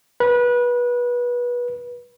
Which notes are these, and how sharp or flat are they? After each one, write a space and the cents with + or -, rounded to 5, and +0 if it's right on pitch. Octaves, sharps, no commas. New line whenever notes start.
B4 -25